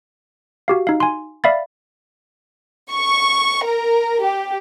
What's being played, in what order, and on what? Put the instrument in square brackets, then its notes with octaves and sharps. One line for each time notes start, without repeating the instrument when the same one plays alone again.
[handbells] F#4 G4 F5
D#4 F5
G#5 C6
D5 E5 F5 B5 A6
[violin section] C#6
A#4
G4